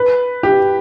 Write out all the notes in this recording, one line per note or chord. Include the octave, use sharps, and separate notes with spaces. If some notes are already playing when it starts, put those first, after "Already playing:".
Already playing: B4
G4